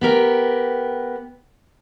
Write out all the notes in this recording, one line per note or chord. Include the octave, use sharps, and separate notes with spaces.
B3 G4 A#4 G5